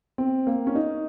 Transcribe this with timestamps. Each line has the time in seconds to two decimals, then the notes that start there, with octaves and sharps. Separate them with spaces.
0.18 C4
0.47 A#3
0.67 C#4
0.75 D#4